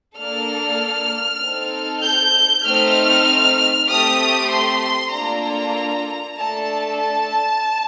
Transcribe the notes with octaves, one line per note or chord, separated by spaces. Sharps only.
A#3 D4 A4 F6
C4 D#4 A4
G6
A3 C4 D#4 F6
A3 C4 G4 D#6
C6
A#3 D4 F4 A4 A#5
A3 D4 A4 A5
A5